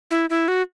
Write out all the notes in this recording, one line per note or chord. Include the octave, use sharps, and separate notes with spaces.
E4
E4
F#4